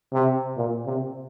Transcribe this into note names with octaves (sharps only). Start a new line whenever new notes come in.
C3
A#2
C3